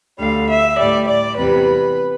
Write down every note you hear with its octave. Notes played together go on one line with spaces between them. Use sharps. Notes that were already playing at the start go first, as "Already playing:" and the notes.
D2 D3 G3 F5
E5
A2 G3 D5
D5
E2 C3 G3 B4